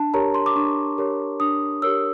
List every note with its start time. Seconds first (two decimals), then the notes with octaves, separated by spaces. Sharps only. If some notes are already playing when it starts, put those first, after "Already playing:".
Already playing: D4 A5
0.14 G4 A#4 C#5 A#5
0.34 C6
0.46 D6
0.56 D4 C#6
0.98 G4 A#4 C#5
1.40 D4 D#6
1.82 G4 A#4 C#5 E6